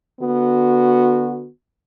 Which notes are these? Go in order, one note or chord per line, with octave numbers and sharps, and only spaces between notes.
D3 B3 F#4